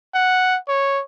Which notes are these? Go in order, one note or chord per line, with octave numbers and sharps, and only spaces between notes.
F#5
C#5